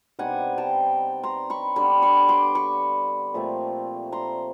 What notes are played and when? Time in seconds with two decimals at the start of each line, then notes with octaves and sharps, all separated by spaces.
0.19 B2 G3 C4 D#4 F#5 G#5
0.58 G5 A5
1.23 A#5 C6
1.50 B5 C#6
1.76 D3 G3 B3 B5 C#6
2.02 B5 C#6
2.29 C6 D6
2.55 B5 C#6
3.34 A#2 F3 A3 C4
4.12 A#5 C6